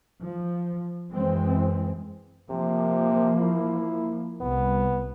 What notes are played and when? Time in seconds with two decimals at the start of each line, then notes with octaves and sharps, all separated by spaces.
0.24 F3
1.11 F#2 E3 G#3 C4
2.51 C3 F3 A#3
3.39 E4
4.41 C2 B3